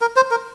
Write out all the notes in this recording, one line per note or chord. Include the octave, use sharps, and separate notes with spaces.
A#4
C5
A#4